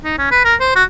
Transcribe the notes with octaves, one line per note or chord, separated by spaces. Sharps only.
D#4
C#4
B4
A#4
C5
F#4